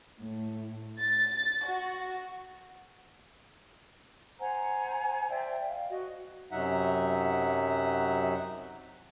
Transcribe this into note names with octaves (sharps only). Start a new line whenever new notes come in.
A2
A6
F#4
C5 F#5 G#5 A#5
C5 D5 E5 G5
F5
F#4 D#5
F#2 C3 F#3 D#4 E5 F#5